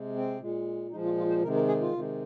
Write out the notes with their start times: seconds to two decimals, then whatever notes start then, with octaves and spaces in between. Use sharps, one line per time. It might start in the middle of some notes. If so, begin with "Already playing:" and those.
Already playing: C3 G#3
0.16 C4
0.41 A#2 G#3
0.91 A#2 F3 G#3 D#4
1.05 F4
1.18 F4
1.30 C5
1.42 C3 D#3 G#3 A#4
1.55 A#4
1.68 G#4
1.81 F4
1.93 C3 D#3 G#3